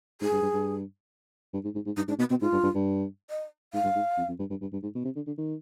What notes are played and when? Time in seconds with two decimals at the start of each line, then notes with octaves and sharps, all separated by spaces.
0.21 G#2 G#4
0.32 G2
0.42 G2
0.54 G2
1.54 G2
1.65 G#2
1.75 G#2
1.86 G#2
1.97 G2 D#4
2.08 G#2 D4
2.19 B2 B3
2.30 B2 C4
2.41 G#2 F4
2.53 G2
2.63 G2
2.75 G2
3.30 D#5
3.74 G#2 F5
3.84 G2
3.96 G#2
4.18 F2
4.29 F2
4.39 G2
4.50 G2
4.61 G2
4.73 G2
4.83 G#2
4.95 B2
5.05 C3
5.16 D3
5.27 D3
5.38 D#3